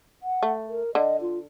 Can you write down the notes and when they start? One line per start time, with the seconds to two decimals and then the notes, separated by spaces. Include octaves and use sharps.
0.23 F#5
0.43 A3
0.69 A#4
0.95 D3 D#5
1.21 F4